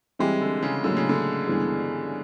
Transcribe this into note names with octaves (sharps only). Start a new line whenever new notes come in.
E3 G3 G#3 C4 E4 G4
D3
C#3
A2 D3 F#3 A#3
C#3
D3
G2 E3 G#3 B3